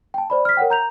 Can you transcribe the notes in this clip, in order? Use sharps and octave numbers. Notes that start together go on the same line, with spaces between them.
G5 A5
C5 D5 B5
F6 B6
A#4 C#5 F#5 G5
A#5 G6 F7